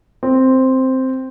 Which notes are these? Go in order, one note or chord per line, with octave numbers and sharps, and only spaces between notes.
C4